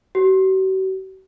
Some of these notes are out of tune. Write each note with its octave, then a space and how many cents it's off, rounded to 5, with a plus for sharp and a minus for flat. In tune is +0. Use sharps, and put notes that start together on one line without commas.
F#4 +45